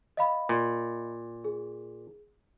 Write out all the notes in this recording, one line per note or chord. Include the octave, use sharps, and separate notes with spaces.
D#5 F5 B5
A#2
G#4